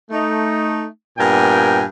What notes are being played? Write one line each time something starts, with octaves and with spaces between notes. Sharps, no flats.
A3 D#4
G2 A#2 B3 A#4 G5 G#5